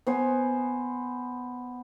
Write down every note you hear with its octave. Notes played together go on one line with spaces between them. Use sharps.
B3 C5 G#5